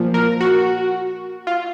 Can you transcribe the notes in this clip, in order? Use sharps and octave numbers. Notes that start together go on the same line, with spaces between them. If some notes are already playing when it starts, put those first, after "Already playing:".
Already playing: A#2 F3
A#4
F#4
F4